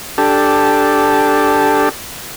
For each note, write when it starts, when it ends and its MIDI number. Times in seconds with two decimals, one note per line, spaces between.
0.18 1.89 62
0.18 1.89 67
0.18 1.89 69